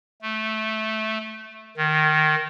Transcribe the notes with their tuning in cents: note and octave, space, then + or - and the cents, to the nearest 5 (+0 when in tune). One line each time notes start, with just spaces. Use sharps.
A3 -10
D#3 -10